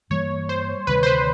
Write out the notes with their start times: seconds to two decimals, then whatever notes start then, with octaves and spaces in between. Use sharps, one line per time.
0.10 G2 E3 G3 A#3 C#5
0.49 C5
0.87 D2 C3 D#3 G3 B4
1.03 C5
1.06 B4